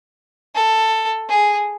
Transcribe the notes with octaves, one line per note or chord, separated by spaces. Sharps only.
A4
G#4